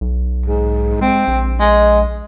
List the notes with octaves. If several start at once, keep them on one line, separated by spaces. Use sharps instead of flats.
B1
G#2
G#3 C4
A#1
G#3